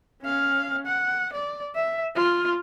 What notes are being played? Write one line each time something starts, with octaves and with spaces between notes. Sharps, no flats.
C#4 F5
F#5
D5
E5
F4